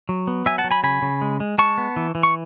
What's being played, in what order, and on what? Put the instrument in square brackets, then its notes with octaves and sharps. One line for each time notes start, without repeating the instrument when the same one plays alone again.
[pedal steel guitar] F#3
B3
F#3 E5 G#5
F#5 A5
F#3
G#5 B5
C#3 G#5 B5
C#3
G#3
G#3
G#3 A5 C#6
B3
E3
E3
C#6